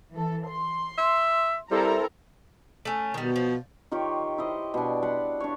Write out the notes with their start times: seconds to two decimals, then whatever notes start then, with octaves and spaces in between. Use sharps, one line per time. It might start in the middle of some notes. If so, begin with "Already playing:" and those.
0.13 E3 A4
0.48 C6
0.98 E5
1.71 G3 C4 E4 A4 A#4 A#5
2.85 A3 C#4
3.14 B2 D#3 G3
3.36 F3
3.91 D#3 F4 G4 C#5
4.38 E4 C5 D#5
4.74 B2 D4
5.03 B4 F#5 C6
5.40 D4 C#5